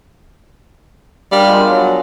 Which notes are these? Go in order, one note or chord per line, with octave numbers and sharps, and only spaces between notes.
G3 D4 A#4 F5
F3 G#3 B3
F#3